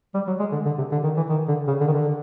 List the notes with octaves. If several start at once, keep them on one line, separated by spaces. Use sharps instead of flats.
G3
F#3
G#3
D3
D3
C3
D3
D#3
E3
D#3
D3
C#3
D3
D#3
D3